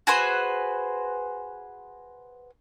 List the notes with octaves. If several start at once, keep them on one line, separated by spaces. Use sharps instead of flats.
F#4 G#4 B4 C5